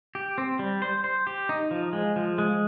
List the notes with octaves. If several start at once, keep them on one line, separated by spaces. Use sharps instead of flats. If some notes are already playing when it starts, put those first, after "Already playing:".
G4
C4
G3
C5
C5
G4
D#4
F3
G#3
F3
G#3